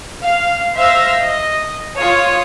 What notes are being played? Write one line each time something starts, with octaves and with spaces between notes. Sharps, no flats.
F5
C5 E5 F5 E6 A#6
D#5
F4 C#5 D#6